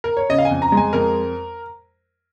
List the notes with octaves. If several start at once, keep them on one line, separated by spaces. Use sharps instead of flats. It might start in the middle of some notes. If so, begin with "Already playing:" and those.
A#4
C#5
C#3 D#5
F5
G#5
F2
A#5
G#3
G#5
F2 A#4